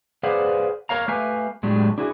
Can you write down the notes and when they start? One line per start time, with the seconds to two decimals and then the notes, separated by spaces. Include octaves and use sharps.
0.23 G#4 B4 C5 D5 F5 F#5
0.89 A#4 C#5 F5 A#5
1.08 A3 G4 B4 E5 F5 G#5
1.63 A2 F#3 G#3 D4 G4
1.98 D4 E4 F#4 G#4